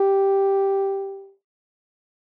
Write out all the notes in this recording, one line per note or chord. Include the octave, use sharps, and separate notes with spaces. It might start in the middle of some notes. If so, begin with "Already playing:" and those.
Already playing: G4